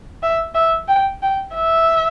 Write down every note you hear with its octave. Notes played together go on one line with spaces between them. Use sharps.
E5
E5
G5
G5
E5